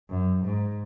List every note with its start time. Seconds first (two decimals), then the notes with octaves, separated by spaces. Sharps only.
0.10 F#2
0.44 G#2